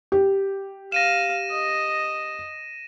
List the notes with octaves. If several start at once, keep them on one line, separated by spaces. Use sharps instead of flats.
G4
F5 A#6 D#7 E7
D#5